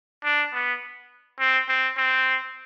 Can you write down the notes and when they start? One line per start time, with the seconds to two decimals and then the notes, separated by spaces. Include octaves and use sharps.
0.24 D4
0.53 B3
1.40 C4
1.68 C4
1.97 C4